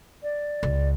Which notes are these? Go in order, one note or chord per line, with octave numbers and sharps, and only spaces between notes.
D5
C#2